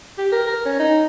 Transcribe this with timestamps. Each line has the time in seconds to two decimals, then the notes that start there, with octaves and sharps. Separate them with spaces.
0.18 G4
0.32 A#4
0.47 A#4
0.65 C#4
0.79 D#4